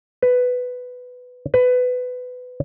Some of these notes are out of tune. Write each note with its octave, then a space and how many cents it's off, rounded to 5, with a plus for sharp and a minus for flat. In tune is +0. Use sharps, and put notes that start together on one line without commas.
B4 +10
B4 +20